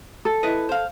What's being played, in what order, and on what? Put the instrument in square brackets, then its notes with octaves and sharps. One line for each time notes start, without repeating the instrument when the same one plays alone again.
[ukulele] A4
[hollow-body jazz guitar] E4 B4 D#5
C5 F5